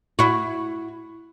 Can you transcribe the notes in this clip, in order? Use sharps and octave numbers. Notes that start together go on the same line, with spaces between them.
E4 F#4